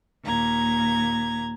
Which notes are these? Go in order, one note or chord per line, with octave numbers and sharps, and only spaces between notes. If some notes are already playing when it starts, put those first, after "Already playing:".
D#2 A#2 A#5 G#6